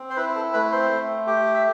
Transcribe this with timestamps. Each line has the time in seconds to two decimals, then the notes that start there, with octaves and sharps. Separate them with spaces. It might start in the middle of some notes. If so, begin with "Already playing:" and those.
Already playing: C4
0.10 C5
0.17 E4 B4
0.35 A4
0.53 A3 B4
0.72 C4 C5
0.91 A3
1.27 G4
1.54 E5